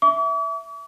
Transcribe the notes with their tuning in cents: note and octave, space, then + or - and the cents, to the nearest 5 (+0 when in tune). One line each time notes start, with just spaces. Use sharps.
E5 +0 D6 -45